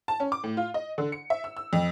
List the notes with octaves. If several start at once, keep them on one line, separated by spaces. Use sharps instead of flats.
A5
C#4
D6
A2
F4
D#5
D3
C#7
E5
E6
E6
F2